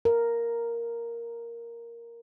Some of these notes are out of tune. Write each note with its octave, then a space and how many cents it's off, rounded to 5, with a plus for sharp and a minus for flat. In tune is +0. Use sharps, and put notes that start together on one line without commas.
A#4 +0